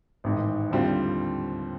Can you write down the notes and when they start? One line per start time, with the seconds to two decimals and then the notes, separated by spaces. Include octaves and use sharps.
0.24 A1 G#2 D#3
0.71 D#2 D3 G3 C4 F4